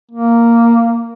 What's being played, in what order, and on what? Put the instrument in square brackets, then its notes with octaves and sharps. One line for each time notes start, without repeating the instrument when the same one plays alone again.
[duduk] A#3